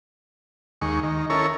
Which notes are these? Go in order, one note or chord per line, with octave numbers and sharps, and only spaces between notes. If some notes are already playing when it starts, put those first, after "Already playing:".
D#2 G#3 C#6
D#3
C#4 E4 A4 A#4 C#5